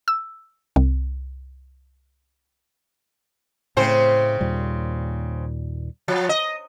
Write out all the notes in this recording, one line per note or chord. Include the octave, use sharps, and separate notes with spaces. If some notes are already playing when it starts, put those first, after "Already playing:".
E6
C2
A2 C#3 A3 C4 C5
D#2 A#2 G3
F3
D#5